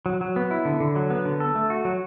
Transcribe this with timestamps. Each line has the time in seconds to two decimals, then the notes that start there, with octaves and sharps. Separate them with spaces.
0.06 F#3
0.21 F#3
0.36 B3
0.51 E4
0.65 D3
0.80 D3
0.96 F#3
1.10 B3
1.25 D3
1.40 A4
1.55 A3
1.70 F#4
1.85 F#3